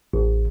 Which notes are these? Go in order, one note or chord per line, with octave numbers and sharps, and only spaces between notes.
A1